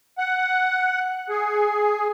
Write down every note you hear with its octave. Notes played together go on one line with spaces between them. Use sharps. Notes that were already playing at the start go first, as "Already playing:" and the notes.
F#5
G#4